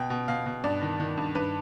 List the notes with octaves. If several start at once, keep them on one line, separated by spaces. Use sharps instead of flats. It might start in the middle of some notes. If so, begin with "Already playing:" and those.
Already playing: B2 G5
B2
B2 F5
B2
G2 D5
D#3
D#3
G2
G2 B4